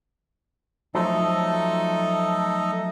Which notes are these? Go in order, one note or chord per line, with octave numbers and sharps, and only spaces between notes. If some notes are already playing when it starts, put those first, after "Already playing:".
F3 F#3 A3 D#4 A4 D#5